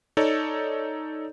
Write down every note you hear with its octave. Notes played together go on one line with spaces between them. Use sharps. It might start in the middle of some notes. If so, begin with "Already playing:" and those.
D#4 A4 C#5 D5